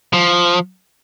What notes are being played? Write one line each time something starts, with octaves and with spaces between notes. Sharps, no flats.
F3